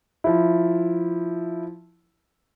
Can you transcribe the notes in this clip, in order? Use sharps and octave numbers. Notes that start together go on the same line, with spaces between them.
F3 E4